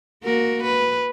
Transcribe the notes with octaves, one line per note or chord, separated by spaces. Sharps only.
A#3 F#4 A#4
B4